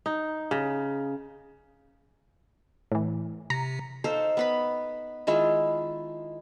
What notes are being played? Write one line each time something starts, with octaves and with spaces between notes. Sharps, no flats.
D#4
C#3
A2 E3
C3 A#5
D#4 A4 C5 F5
B3 B4 B5
D#3 G#3 E4 F4